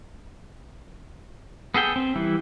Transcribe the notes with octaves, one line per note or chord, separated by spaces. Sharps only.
B3 G#4 A4 G5
C4
E3 G3 E4